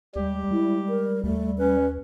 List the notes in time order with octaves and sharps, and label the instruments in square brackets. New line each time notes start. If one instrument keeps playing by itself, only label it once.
[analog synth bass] D#2 [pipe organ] G3 [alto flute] G#3 [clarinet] G4
[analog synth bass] G#3 [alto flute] E4
[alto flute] A#4
[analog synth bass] D#2 [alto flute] A3
[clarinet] C#4 [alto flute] B4